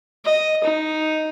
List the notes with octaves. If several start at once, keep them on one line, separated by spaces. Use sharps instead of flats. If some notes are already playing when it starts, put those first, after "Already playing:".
D#5
D#4